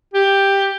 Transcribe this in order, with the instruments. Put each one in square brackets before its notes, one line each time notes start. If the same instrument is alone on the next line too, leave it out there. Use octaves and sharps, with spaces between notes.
[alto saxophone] G4